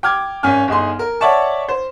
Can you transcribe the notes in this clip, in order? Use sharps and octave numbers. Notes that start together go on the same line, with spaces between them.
G5 D6 F6 G#6
G#1 C#4 G#5 F6
G1 D#4 G#4 C6
A#4
C#5 D5 E5 F#5 A5 C#6
C5